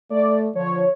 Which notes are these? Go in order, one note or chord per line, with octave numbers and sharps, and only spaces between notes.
A3 D5
D3 F3 C#5